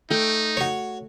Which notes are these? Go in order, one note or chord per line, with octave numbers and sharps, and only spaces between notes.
A3 D#4 G5
F#4 C#5